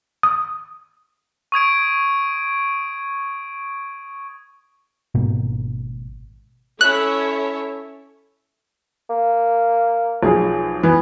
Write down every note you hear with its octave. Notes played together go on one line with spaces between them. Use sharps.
D#6
C#6 D#6 G#6 D7
G#1 G#2 B2 A#3
C#4 E4 A4 C#5 E5 F#6
A#3
B1 F3 G#4
E3 B3